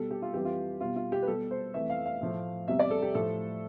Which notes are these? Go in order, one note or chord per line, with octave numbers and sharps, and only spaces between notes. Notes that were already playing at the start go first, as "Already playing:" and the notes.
Already playing: B2 G3 A4
G4
F4
F2 E3 G3 G4
F4
B2 G3 F4
F4
G4
B4
B2 G3 A4
C5
F2 E3 A3 E5
F5
F5
A2 F3 A3
E2 C3 G3 E5
D5
A4
G4
A2 F3 A3 A4